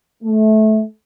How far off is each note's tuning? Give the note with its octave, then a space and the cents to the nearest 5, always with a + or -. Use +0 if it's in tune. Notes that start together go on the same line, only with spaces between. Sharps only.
A3 -20